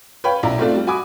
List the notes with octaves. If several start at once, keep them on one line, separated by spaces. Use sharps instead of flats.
B4 C#5 F5 G5 B5
B1 E4 D5 A#5
G#2 A3 C4 F4 A4 D5
G3
F#4 G#5 B5 D6 D#6